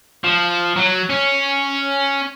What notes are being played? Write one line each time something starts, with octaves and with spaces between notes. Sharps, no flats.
F3
F#3
C#4